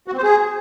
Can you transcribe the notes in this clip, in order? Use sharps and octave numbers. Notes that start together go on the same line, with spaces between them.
F#4
C4
C5
G#4